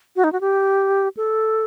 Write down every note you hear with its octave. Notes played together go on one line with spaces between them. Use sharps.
F#4
D#4
F#4
G4
A4